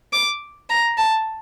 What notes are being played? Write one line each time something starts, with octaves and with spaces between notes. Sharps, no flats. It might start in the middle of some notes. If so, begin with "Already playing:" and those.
D6
A#5
A5